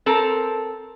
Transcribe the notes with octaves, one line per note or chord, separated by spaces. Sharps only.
C4 A4 A#4